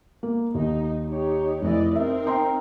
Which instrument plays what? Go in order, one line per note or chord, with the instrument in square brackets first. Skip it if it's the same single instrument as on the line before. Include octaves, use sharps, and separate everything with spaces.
[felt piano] A#3
[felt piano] D#2 [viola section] D#4
[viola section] D#4 G4 C#5
[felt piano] F1 E4 [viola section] E3 D5 D#5
[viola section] C4 D#4 A#4 [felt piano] E5
[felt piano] G5 A#5 C6